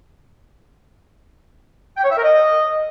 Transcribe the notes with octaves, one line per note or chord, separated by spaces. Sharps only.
G5
C#5
E5
A#4
D#5